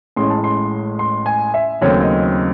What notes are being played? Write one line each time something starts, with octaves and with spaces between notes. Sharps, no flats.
A1 A2 G#3 C#4 C6
A5
C6
C6
G#5
E5
D#2 C#3 F#3 A3 C4 C#5
D#5